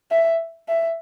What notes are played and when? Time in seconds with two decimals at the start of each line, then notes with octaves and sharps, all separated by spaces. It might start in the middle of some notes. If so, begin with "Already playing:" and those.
0.11 E5
0.68 E5